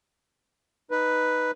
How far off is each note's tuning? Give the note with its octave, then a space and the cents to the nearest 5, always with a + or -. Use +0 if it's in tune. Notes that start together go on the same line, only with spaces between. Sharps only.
D#4 +0 B4 +0